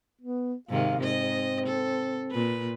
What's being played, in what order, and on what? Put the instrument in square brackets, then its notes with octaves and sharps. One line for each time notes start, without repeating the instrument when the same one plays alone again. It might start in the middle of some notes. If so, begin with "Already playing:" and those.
[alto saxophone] B3
[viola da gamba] G#2 C3 D#3 [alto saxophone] F5
[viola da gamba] G#2 D#5 [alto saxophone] C4
[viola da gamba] A4
A#2 B4